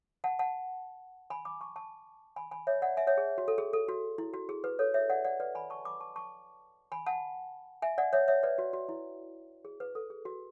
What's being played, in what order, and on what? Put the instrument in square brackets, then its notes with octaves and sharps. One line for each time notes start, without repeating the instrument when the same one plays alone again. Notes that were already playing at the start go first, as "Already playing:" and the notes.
[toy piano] F#5 A5
F#5 A5
G#5 B5
B5 D6
A5 C#6
A5 C#6
G#5 B5
G#5 B5
C#5 E5
D5 F#5
E5 G#5
C#5 E5
G#4
F#4
A4
G#4
A4
F#4
E4
F#4
G#4
B4
A4 C#5
C#5 E5
D5 F#5
D5 F#5
B4 D5
G#5 B5
A5 C#6
B5 D6
A5 C#6
A5 C#6
G#5 B5
F#5 A5
E5 G#5
D5 F#5
C#5 E5
C#5 E5
B4 D5
F#4
F#4
E4
G#4
B4
A4
G#4
F#4